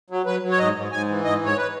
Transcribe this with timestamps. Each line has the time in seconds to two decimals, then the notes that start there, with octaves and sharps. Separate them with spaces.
0.10 F#3
0.26 F#3 B4
0.42 F#3
0.51 C#5
0.59 G#2 D#5
0.75 G#2
0.92 G#2 G#5
1.08 E3
1.24 G#2 D#5
1.41 G#2 C#5
1.58 B4